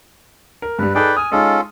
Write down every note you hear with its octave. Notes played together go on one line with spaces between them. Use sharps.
A#4
G2 G3 B4
D#4 G#4 A4 B4 D5 G5
G#5 D#6 F6
G#3 C#4 D#4 F4 A4